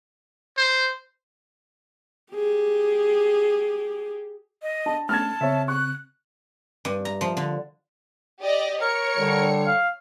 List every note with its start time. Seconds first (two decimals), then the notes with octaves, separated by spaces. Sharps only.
0.58 C5
2.33 G4 G#4
4.62 D#5
4.86 D4 A5
5.09 A3 C#4 D4 A5 F6 G#6
5.41 C#3 C4 C#5 E5
5.68 C#6 F#6
6.85 G2
7.05 A#5
7.21 F3
7.37 D3
8.42 G4 D5 D#5
8.81 A#4 C#5 C#7
9.17 D3 G3
9.67 F5